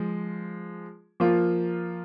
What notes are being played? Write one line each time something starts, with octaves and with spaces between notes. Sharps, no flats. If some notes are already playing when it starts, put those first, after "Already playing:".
Already playing: F3 G#3
F3 A#3 F4